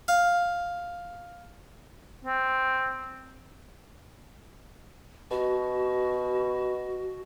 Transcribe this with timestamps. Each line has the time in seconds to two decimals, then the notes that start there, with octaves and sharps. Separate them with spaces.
0.08 F5
2.25 C4
5.31 B2 F#4